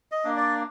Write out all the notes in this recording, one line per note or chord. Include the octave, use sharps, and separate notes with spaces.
D#5
A#3 D4
D5